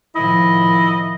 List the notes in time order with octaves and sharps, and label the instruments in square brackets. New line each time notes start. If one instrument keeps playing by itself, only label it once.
[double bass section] A2 D#3 F3 [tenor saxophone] E4 [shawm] D#5